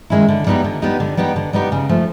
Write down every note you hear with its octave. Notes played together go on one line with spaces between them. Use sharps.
D#3 G#3 C#4 E4
D3
G3 B3 D#4 G4
D3
G3 B3 D#4 G4
D3
G3 B3 D#4 G4
D3
G3 B3 D#4 G4
C#3
F3 A3